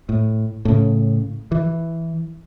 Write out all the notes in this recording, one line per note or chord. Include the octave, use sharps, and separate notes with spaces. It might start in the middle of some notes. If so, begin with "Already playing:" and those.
A2
A2 C#3
E3